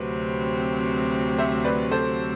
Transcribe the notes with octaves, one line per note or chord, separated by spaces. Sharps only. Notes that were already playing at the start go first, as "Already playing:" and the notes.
Already playing: D2 C3 F#3 C4 B4
C5 E5
B4 D5
A4 C5